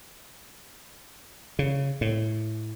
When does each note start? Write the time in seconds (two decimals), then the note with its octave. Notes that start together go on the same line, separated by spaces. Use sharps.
1.59 C#3
2.01 A2